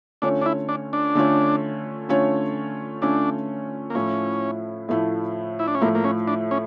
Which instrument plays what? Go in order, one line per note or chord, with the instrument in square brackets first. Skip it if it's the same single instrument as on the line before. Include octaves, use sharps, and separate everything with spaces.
[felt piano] D3 A3 C#4 F4 C#5 [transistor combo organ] D4
[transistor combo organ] D4
E4
D4
D4
[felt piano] D3 A3 C#4 F4 C#5
D3 A3 C#4 F4 C#5
[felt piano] D3 A3 C#4 F4 C#5 [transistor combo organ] D4
[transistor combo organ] A#3
[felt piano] A2 F3 A3 E4 [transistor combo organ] C#4
[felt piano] A2 F3 A3 E4
[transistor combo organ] E4
D4
C#4
[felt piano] A2 F3 A3 E4 [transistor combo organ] A#3
[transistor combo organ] A#3
C#4
D4
C#4